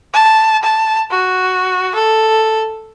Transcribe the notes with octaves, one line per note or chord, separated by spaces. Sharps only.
A5
A5
F#4
A4